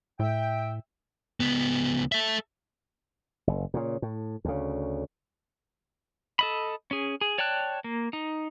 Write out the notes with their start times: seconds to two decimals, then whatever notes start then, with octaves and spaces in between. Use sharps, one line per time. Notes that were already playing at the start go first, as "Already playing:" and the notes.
0.19 A2 E5 G5
1.40 C#2 B3
2.12 A4 E5
3.47 F#1
3.74 A#2 C#3
4.02 A2
4.45 D2 C#3
6.39 A4 D#5 B5
6.91 C#4 G#4
7.21 G#4
7.38 C#5 D5 G5 A5 F#6
7.84 A#3
8.13 D#4